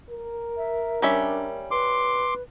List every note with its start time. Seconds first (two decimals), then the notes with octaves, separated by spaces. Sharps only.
0.10 A#4
0.57 E5
1.02 G3 C#4 D4 E5
1.71 B4 C6 D6